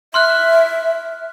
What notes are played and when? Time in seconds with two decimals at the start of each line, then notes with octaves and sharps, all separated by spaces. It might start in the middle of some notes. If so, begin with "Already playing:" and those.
0.14 E5 C6 F6 F#6